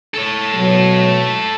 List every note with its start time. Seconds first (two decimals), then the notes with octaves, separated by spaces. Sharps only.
0.14 A4 C#5
0.54 B2 F#3